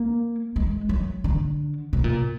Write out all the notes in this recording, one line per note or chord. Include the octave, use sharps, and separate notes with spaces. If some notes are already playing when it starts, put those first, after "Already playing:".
Already playing: A#3
G#3
F#3
D3
B2
A#2